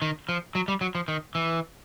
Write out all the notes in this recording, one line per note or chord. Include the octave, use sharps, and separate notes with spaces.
D#3
F3
F#3
G3
F#3
F3
D#3
E3